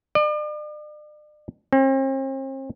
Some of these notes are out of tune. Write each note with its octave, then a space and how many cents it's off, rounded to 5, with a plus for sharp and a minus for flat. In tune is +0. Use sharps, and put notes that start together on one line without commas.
D5 +40
C4 +40